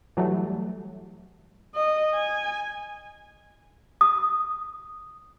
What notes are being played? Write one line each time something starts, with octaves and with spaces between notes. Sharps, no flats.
E3 F#3 G3 A3
D#5
G#5
D#6